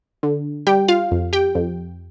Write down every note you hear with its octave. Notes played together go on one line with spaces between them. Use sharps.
D3
G3 G4 G5
F4 F5
F2
G4 G5
F2